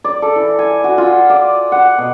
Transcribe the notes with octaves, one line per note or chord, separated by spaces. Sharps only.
D5
A4
E3
G#5
F#4
F4
D5
F#5
B2